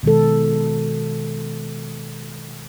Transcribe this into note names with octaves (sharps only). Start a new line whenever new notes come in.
B2 D#3 G#3 A4